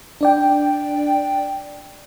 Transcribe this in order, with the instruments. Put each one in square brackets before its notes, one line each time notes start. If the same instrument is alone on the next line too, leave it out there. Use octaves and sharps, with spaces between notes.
[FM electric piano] D4 D5 G5